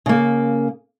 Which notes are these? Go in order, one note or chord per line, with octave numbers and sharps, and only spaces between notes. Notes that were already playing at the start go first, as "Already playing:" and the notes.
C#3 A#3